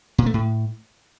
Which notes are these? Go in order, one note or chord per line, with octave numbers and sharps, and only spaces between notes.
A#2
A3
A2